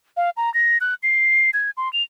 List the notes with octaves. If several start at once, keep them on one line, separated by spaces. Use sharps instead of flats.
F5
A#5
A#6
F#6
C7
G#6
C6
F7